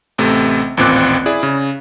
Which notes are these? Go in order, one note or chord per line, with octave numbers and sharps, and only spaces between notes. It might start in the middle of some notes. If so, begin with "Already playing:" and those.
A1 C3 A3
A1 D#2 A#2 C4 D6 F#6
E4 G#4 D5
C#3